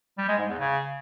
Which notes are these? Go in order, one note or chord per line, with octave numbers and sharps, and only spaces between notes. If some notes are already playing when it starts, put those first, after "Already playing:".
G3
G#3
G#2
E2
C#3